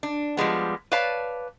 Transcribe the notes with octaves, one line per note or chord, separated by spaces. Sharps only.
D4
F3 G3 G#3 B3
B4 C#5 D5 F5 A5